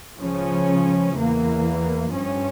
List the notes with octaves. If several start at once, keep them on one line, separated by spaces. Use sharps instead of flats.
C#2 C#3 F3 C#4
E2 E3 A#3
G2 F3 C#4